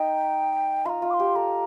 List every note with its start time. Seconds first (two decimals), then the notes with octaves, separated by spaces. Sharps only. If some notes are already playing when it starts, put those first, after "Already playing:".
Already playing: D#4 G5
0.85 F4 C6
0.89 A#5
1.02 F4
1.10 D6
1.14 C6
1.20 G4
1.36 A4 A#5